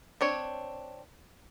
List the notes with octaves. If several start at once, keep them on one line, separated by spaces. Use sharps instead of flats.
C4 D4 C#5